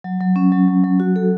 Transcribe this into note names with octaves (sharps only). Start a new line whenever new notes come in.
F#3
F#3
C#4
F#3
F#3
F#3
F#4
A4